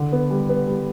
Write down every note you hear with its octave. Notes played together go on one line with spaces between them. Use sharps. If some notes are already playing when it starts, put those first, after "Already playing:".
Already playing: D3
B3
G3
B3
G3